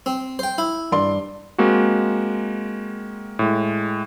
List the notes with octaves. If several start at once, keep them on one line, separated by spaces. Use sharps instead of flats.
C4
C5 G5
E4
G2 D5 C6
G#3 A#3 C4 F#4
A2 G#3